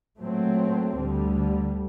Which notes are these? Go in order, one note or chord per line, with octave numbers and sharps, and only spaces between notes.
A#2 F#3 A3 C4
D2 D3 G3